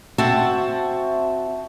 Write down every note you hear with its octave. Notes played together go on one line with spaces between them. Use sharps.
C4 F#4 E5 F#5 A5